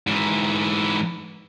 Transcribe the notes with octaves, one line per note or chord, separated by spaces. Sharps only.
G#2 E3